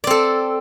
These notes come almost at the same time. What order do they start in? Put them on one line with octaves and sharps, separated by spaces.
D5 C4 A4